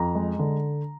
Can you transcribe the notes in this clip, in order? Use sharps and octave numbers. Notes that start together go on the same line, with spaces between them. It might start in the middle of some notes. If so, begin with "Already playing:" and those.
Already playing: F2 A#5
G#3
D3